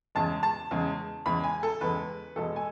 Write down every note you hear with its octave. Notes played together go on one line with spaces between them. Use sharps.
E2 C#3 G#3 A5
A5
E2 C#3 G#3
E2 C#3 G#3 B5
G#5
A4
E2 C#3 G#3 B4
E2 B2 G#3 A4
G#5